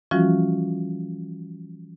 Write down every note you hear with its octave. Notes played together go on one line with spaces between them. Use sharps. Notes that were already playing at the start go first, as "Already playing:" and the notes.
E3 F3 G3 C#4 F4 F#4